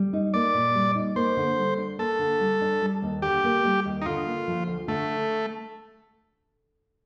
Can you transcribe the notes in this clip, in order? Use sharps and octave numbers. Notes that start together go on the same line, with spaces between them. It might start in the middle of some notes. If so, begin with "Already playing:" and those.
Already playing: G3
D#4
A#3 D5
A#2
G3
D#4
A#3 C5
D3
G3
D4
A#3 A4
D3
G3
D4
G3
D#2
D3 G4
A#3
G3
D#2
D#4
D3 F4
A#3
F3
D2
D3 A3